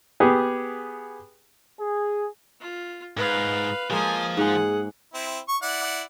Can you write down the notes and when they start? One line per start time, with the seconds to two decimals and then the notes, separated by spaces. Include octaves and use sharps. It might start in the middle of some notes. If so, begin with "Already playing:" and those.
0.20 B3 G4 G#4
1.80 G#4
2.61 F4
3.17 G#2 B4 F5
3.90 F3 G#3 A#3 G#5 D#6
4.37 G#2 G#3 G#4 F#5
5.14 C4 E4
5.48 C#6
5.62 E4 D5 F#5